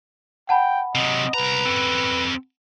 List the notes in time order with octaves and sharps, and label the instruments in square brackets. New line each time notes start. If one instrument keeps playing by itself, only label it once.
[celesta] F#5 A5 B5 [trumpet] G5
[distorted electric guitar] C3 F#3 [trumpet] D#5
[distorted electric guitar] C2 A#5 [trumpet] B4
[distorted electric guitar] C4 A4